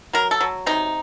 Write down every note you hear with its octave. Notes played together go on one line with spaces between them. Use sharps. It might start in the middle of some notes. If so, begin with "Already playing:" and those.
F#3 A#4
A4
F#3
C3 D#4